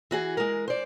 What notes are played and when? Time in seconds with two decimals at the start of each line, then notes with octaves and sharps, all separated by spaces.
0.11 E3 F#4 G#4
0.37 G#3 A#4
0.68 C5 D5